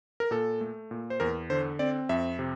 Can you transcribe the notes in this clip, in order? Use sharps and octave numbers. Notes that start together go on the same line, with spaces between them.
A#4
A#2 A4
A3
A#2
C5
E2 A#4
D3 C5
C4 D5
F2 E5
C3